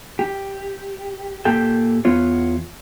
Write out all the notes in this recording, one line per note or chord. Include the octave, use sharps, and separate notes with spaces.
G4
A#2 G4 A4 G5
E2 B3 F4 C#5